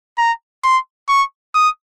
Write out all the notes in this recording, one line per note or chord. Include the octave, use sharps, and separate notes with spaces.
A#5
C6
C#6
D#6